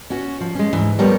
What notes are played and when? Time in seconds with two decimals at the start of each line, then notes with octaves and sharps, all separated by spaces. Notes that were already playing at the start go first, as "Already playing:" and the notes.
0.10 C#4 F#4
0.41 F3
0.55 G#3 C#4
0.73 D2 G#2 E3
0.99 F3 G3 A3 B3 A#4 C#5